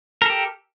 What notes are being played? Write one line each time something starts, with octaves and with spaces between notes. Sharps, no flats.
G4 A4 A#4